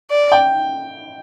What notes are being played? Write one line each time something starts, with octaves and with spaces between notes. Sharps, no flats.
D5
G5